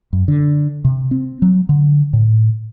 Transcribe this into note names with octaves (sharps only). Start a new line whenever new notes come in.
F#2
D3
C3
C4
F#3
D3
A2